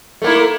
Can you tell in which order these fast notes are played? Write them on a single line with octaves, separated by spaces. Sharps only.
A3 A#3 E4